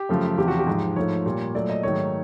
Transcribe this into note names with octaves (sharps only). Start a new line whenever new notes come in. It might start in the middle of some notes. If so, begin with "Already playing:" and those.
Already playing: G4
F#2 C#3 F3 A3
E2 C3 F3 G4
F#4
G4
G#2 F3 G#3
G#2 F3 A3 C#5
A#2 G3 A#3
A#2 F#3 A3 D5
D#5
G#2 D#3 F#3 A3 C#5